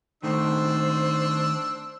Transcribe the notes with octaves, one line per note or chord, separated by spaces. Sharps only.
D#3 A3 C4 D4 C5 E6